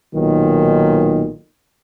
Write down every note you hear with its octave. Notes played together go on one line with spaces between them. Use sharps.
B1 A#2 D#3